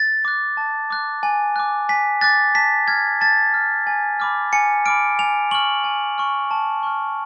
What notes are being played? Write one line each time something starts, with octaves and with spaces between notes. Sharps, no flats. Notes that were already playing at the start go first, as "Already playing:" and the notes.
Already playing: A6
D6 F#6
A5
D6 F#6
G#5
D6 F#6
G#5 B6
D6 F#6 A6
A5 B6
F6 G#6
A5 A6
F6
G#5
B5 D6 F6
G#5 C#7
B5 D6 F6 D7
G#5 F7
C#6 F6 F#7
G#5
C#6 F6
A5
C#6 F6